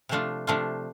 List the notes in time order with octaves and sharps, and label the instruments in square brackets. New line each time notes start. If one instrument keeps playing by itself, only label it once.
[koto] C3 F3 A3 D4 F4
C3 F3 A3 D4 F4